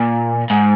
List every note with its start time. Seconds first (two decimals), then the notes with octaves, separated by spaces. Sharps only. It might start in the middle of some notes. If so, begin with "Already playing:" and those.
Already playing: A#2
0.50 G#2